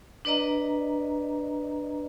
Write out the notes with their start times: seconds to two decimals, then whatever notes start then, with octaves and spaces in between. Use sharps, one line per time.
0.25 D4 B4 D5 D#5 A#5